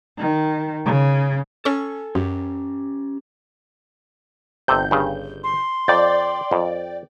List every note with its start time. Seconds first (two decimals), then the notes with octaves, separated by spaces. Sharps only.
0.18 D#3
0.85 C#3
1.65 C#4 A4 G#5 C#6
2.15 F#2 C#4 G4
4.68 G1 C3 A4 G6
4.91 G2 C#3
5.44 C6
5.88 F2 D5 G5 A6
6.51 F2